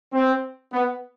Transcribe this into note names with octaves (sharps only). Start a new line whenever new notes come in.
C4
B3